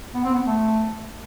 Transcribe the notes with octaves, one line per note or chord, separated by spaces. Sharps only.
B3
C4
B3
A3